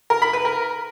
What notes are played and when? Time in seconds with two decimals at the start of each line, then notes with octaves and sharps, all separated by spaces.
0.10 A#4
0.22 B5
0.33 B4
0.45 A#4